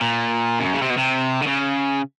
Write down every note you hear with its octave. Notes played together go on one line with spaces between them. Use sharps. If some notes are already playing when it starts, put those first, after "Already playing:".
A#2
F#2
C#3
C3
B2
C3
D3
C#3